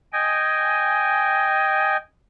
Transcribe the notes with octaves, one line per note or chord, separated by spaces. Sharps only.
D#5 G5 G#5